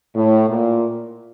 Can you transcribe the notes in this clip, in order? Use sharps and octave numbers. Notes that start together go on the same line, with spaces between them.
A2
A#2